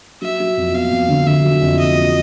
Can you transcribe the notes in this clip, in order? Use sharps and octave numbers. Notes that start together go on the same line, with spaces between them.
F#3 E5
F#3
F2
B3 F5
F2
D3
D3 E5
F#3
F2
F2 D#5
F#3